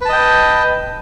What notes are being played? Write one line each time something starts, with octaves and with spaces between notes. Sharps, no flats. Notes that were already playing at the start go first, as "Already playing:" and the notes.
B4 D#5 G5 A5